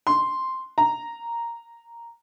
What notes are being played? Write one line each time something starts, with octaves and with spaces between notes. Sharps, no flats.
C6
A#5